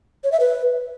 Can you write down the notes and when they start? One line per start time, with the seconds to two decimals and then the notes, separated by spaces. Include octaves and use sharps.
0.24 C#5
0.32 E5
0.40 B4